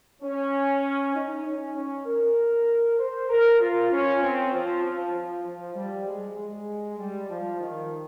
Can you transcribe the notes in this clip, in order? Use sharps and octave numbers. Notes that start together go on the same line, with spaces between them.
C#4
D#4
C#4
C#4
A#4
C5
A#4
F4
C#4
C4
F3
F3
F3
F3
G3
G#3
G#3
G3
F3
D#3